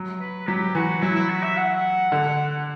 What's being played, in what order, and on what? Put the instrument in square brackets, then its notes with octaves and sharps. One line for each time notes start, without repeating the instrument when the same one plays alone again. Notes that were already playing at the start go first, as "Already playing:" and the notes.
Already playing: [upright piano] F#3
[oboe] B4
[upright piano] F#3 [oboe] G4
[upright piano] E3 [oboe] F#4
[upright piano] F#3 [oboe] E4
[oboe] E4
F#4
E5
F#5
[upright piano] D3